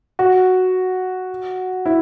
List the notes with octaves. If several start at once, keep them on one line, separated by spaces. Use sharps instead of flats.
F#4
E4